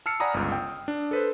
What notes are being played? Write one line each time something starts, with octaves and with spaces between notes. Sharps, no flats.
A5 E6 F6 C7 C#7
D5 F#5 G#5 A#5 B5 D#6
G1 C#2
G5
D4
A4 B4 C5